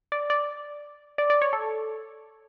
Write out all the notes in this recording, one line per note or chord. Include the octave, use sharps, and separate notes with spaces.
D5
D5
D5
D5
C#5
A4